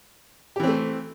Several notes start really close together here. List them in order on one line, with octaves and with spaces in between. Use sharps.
G4 E3 C4 A3